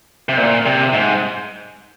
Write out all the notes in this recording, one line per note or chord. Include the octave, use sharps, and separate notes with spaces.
C3
A#2
C3
G#2